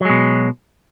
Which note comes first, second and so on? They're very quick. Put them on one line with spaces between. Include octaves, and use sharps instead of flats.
F#3 G#3 B2